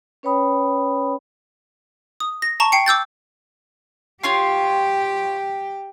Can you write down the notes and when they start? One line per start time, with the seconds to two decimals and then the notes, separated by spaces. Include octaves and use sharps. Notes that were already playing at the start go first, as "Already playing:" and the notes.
0.23 C#4 B4 C#5 G5 B5 D#6
2.20 D#6
2.42 A#6
2.60 A5 A#5 C#6
2.72 G5 C7 C#7
2.86 D6 E6 G6 A6
4.23 F4 G4 C#5 G5 C6